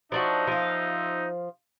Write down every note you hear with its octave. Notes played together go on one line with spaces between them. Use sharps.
F3 D4 D#4 F#4 E5
F3 F5